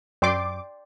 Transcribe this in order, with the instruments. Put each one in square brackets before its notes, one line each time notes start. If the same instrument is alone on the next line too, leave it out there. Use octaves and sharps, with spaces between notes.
[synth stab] F#2 D6 [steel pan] D5 G5 C6